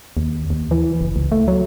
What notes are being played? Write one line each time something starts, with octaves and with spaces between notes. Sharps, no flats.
D#2
D#2
E3
F#1
C#2
A3
F#3